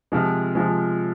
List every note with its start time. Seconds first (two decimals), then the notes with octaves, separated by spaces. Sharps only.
0.12 C3 F3 G#3
0.55 C3 F3 G#3